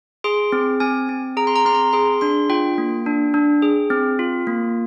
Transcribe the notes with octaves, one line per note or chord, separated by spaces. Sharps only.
G#4 C6
C4
C4 G#5
C4
G#4 A#5
C6
A#5
C4 C6
A#5
G#4 C6
D4 C6
F4 G5
A#3
D4
D4
G#4
C4
F4
A#3